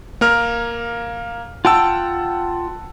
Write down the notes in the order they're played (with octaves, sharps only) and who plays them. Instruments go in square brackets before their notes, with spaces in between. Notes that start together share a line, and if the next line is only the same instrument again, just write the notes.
[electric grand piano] A#3 A#4 F6
[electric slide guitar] F4 G5 [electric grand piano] F#5 A5 E6